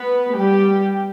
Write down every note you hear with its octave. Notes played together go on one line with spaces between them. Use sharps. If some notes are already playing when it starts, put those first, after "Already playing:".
Already playing: B3 B4
G3 G4